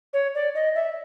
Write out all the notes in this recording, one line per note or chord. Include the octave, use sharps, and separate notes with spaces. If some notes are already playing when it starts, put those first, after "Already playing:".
C#5
D5
D#5
E5